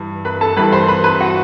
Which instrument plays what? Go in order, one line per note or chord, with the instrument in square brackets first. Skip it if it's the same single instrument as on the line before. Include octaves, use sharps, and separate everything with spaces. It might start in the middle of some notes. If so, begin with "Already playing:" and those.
Already playing: [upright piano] G2 E3
B4 B5
A4 A5
G2 E3 G3 B4 B5
C5 C6
B4 B5
B4 B5
F#4 F#5